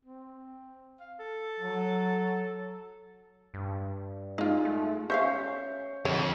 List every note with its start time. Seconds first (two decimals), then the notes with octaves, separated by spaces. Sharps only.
0.05 C4
1.00 F5
1.19 A4
1.60 F#3
3.54 G2
4.38 G#3 D#4 F4
4.65 A3
5.10 C#4 C5 E5 F5 C#6 G6
6.05 F2 D3 C#5